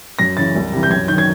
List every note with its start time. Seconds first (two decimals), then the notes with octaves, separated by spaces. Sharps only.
0.19 F#2 A#6
0.37 C#3 E3 A6
0.56 C2
0.73 C3 E3
0.83 G6
0.90 F#2 G#6
1.08 D#3 F#3 G6
1.18 G#6